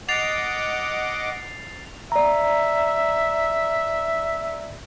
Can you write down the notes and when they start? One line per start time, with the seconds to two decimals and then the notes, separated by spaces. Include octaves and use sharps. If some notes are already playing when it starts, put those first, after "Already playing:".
0.09 D#5 F#5 D6 A6 C7 F7
2.12 D5 E5 A#5